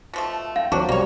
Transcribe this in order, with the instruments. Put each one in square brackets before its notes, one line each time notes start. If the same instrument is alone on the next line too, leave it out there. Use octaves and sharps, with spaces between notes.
[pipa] B2 F3 A3
[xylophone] F5 [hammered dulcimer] G5
[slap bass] D2 D#3 F3 [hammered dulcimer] F#3 C4 [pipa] D4 F#4
[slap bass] B1 [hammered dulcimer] G3 [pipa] A#3 C#5